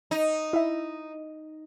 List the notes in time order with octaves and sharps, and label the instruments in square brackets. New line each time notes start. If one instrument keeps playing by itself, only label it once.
[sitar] D#4
[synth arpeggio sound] E4 E5